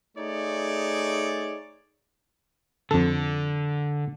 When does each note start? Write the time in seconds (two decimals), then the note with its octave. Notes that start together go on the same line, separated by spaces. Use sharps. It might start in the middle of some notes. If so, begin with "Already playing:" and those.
0.17 A3 D#4 G#4 C#5 D5
2.91 F2 D3 A4